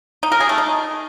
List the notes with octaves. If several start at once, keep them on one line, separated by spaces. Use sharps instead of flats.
D#4
A#4
G#4
A3
D#4